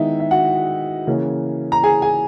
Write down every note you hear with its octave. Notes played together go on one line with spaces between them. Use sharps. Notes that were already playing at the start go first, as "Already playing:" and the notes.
Already playing: D#3 G#3 B3 D#4 E4 E5
E5
F#4 F#5
C#3 E3 A#3 C#4
A#5
G#4 G#5
G#4 G#5